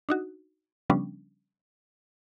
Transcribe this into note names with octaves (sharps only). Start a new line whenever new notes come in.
D4 D#4 F#4
C#3 F3 G3 B3 C#4 D4